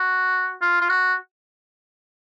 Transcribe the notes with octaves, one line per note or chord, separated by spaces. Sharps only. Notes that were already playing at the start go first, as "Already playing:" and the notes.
Already playing: F#4
F4
F4
F#4